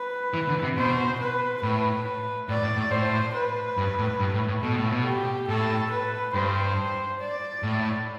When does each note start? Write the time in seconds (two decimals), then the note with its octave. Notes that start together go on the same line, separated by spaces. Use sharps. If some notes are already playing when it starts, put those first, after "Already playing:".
Already playing: B4
0.34 E3
0.48 D3
0.63 C3
0.77 B2 C5
1.19 B4
1.62 A2 B4
2.49 A2 D5
2.63 A2
2.77 A2
2.91 A2 C5
3.34 B4
3.77 G2
3.98 A2
4.20 G2
4.34 A2
4.48 A2
4.62 B2 A4
4.76 A2
4.90 B2
5.05 G4
5.48 A2 A4
5.91 B4
6.34 G2 C5
7.20 D5
7.63 A2